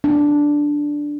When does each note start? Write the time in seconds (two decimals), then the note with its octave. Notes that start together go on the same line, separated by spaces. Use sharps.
0.04 D4